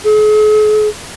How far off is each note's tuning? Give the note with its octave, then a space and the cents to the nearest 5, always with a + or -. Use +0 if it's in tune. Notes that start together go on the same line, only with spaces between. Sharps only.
G#4 +45